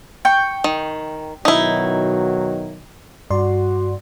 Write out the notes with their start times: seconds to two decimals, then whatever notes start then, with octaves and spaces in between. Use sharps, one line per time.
0.25 G5 C#6
0.64 D#3
1.45 B2 D#3 F#3 D#4 E4
3.30 G2 F#4 D5 C6